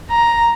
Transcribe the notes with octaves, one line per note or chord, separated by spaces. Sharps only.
A#5